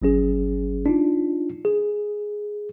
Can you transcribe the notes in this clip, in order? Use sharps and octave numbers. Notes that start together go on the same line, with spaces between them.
G1 F#3 C#4 G#4
D4 D#4 F4
G#4